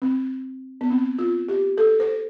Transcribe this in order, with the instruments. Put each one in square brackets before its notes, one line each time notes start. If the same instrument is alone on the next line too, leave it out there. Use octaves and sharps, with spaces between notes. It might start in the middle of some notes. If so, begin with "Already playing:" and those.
[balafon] C4
B3
C4
F4
G4
A4
C5